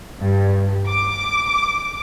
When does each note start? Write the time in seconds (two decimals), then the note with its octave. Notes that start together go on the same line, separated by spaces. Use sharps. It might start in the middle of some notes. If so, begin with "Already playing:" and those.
0.21 G2
0.89 D6